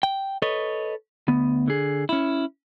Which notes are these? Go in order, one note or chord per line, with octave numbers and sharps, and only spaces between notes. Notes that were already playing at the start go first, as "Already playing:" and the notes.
G5
A4 B4 C#5 D#5
D2 B3
D3 G#4
C#4 E4